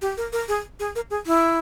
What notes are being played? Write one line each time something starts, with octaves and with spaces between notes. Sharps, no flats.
G4
A#4
A#4
G#4
G#4
A#4
G#4
E4